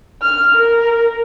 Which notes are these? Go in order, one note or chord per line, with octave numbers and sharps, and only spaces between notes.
F6
A#4